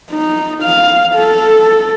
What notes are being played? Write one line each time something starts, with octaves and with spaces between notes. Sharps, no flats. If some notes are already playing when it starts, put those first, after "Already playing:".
D#4
F5
A4